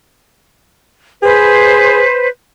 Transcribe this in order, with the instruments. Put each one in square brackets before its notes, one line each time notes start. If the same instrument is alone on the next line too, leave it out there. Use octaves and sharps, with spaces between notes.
[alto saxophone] G#4 [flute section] B4 C5